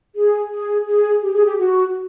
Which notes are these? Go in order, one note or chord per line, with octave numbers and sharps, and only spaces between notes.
G#4
G#4
G#4
G4
G#4
G4
F#4